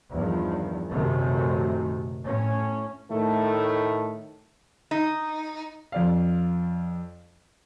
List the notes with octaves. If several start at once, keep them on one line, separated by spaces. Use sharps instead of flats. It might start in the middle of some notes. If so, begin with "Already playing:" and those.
E2 G2 D#3 F3
A#1 F#2 C3 D#3 A3
A2 C#4
A2 D#3 A3
D#4
F2 D5 F5